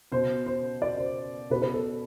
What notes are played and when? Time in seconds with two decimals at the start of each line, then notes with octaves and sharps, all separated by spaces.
0.12 B2 C5
0.46 C5
0.82 D5
0.98 C5
1.50 B2 B4
1.62 B4
1.74 A4